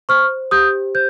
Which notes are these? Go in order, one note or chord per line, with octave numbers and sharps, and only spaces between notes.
C5 C#6 F6
G4 D#6 G6
C5 G6